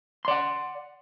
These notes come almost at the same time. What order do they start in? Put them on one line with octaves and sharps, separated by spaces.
C6 D5 F#5